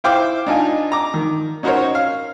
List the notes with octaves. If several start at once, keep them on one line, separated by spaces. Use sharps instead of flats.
E4 C5 F5 G5 D6
D4 D#4 F4 G#5
A#5 D6
D#3
C#4 D#4 F#4 A#4 C5 C#5
F5